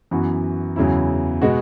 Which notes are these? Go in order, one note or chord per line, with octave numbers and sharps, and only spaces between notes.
F#2 E3 B3 F#4
E2 C#3 F#3 E4
B2 G#3 B3 F#4